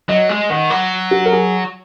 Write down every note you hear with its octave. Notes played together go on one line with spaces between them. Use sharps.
F#3 D#5
G#3
D#3 F#5
F#3
F#4
A#4
G#4